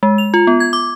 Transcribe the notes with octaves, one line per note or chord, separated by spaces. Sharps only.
G#3
F7
F4
B3
G#6
D6